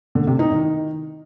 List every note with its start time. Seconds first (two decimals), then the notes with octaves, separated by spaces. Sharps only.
0.15 D3
0.27 C3
0.39 D#4
0.51 D#3